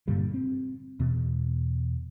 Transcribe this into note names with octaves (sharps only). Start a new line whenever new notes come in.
G2 A#2 D3 G3
C4
E2 B2